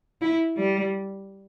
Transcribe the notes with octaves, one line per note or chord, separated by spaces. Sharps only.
E4
G3